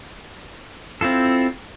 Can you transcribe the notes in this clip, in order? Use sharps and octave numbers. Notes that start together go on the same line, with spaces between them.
C4 E4 F4 A4